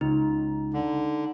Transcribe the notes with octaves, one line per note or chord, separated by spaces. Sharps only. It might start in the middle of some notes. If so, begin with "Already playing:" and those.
C#2 D#4
D3